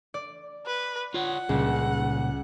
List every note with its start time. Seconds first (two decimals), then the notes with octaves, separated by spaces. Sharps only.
0.14 D5
0.67 B4
1.14 F4 C#5 F#5
1.49 C#2 A#2 C#3 G3